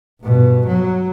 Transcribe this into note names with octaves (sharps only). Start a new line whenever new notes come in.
G2 B2
F#3